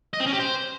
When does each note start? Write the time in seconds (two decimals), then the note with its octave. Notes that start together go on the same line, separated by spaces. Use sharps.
0.13 D#5
0.20 C4
0.26 C#4
0.33 G4
0.40 C5